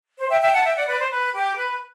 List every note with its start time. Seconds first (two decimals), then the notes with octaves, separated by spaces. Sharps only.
0.17 C5
0.30 E5 G5
0.41 E5 G5
0.52 F#5 A5
0.63 E5 G5
0.76 D5 F#5
0.87 B4 D5
0.98 C5
1.10 B4
1.33 G4
1.56 B4